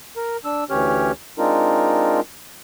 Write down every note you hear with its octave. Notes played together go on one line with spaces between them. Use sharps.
A#4
D4 E6
D2 E3 C#4 G4 C#5 F6
G#3 C4 D4 D#4 F4 A#4